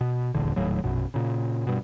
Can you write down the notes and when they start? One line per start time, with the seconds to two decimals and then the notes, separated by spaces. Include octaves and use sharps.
0.01 B2
0.34 D#1 A#1 E2 D3
0.56 D#1 D#2 A2 F#3
0.84 A#1 F#2 B2
1.14 A#2 C#3
1.67 G2 B2